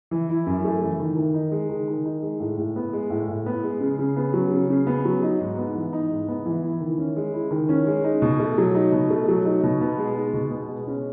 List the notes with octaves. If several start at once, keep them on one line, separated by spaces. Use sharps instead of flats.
E3
E4
F#2
A3
E3
D#3
D#3
D#4
G#3
D#3
D#3
D#4
G#3
A2
A2
B3
G#3
A2
A2
B3
G#3
C#3
C#3
B3
F#3
C#3
C#3
B3
F#3
D#4
G#2
B3
E3
D#4
G#2
B3
E3
E4
D#3
C#4
G#3
E4
D#3
C#4
G#3
D#4
B2
A3
F#3
D#4
B2
A3
F#3
D#4
B2
B3
G#3
D#4
B2
B3
G#3
C#4